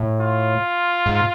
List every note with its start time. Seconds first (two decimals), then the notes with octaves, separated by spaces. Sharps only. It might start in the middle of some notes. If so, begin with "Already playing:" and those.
Already playing: A2
0.21 F4
1.06 G#2